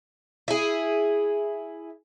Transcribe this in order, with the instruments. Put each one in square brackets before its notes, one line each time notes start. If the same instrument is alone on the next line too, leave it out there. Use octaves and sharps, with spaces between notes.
[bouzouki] E4 G#4